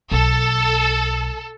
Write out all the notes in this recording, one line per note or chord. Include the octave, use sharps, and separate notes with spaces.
B1 A4